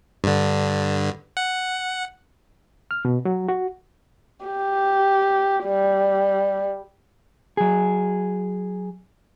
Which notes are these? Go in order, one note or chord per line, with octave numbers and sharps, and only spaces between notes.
G2 D3
F#5
F6
B2
F#3
F#4
G4
G3
F#3 G#4